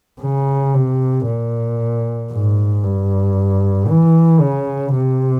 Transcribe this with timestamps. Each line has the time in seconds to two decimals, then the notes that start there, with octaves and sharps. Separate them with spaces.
0.22 C#3
0.74 C3
1.27 A#2
2.31 G#2
2.84 G2
3.88 E3
4.40 C#3
4.93 C3